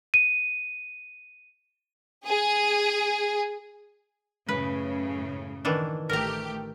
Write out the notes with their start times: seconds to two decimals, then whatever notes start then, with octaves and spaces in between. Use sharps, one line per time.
0.14 D#7
2.25 G#4
4.49 F#2 A2 C#3 B4
5.65 D#3 E3 D4
6.09 A1 A3 G4 A#4 A#5